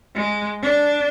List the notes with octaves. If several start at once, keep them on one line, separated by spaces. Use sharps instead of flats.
G#3
D4